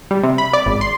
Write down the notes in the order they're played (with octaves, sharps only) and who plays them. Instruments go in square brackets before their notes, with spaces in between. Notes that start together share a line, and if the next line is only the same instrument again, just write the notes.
[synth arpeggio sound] G3
C3
B5
D5
G#1
C6